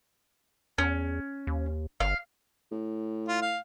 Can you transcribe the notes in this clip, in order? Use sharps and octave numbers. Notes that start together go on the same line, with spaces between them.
E2 C#4
D#2
G1 F5
A2
F4
F5